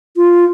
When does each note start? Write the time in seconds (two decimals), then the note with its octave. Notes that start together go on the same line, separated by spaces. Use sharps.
0.17 F4